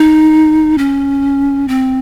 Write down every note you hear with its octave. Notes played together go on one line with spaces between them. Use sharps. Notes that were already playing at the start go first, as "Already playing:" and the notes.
Already playing: D#4
C#4
C4